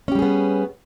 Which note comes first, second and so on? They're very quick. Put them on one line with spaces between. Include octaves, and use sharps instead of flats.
C#4 G4 G3 G#4 B3